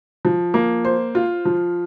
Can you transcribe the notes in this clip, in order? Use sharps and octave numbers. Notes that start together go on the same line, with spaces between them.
F3
A#3
C5
F4
F3